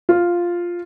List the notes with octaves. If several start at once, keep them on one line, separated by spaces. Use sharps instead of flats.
F4